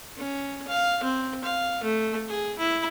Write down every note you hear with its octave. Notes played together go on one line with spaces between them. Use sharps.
C#4
F5
C4
F5
A3
G#4
E4